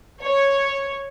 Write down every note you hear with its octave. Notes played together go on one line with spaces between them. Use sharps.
C#5